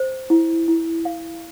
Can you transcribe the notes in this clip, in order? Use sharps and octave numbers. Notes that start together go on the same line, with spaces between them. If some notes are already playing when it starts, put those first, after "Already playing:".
Already playing: C5
E4
E4
F5